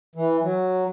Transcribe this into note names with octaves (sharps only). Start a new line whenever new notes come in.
E3
F#3